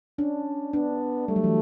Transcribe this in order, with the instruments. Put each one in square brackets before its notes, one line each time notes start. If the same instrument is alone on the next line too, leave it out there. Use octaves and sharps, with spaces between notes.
[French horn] C#4 [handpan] D4
[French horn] B3 [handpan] D4
[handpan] G3 [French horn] A3
[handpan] F#3
E3